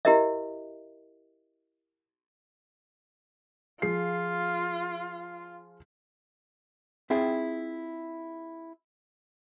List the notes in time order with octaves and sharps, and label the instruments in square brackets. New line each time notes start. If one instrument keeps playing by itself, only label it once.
[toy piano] E4 G4 A#4 D#5 E5
[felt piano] F3 G#4 C7 [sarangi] F4
[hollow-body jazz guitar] C4 E4 F4 G#4 G5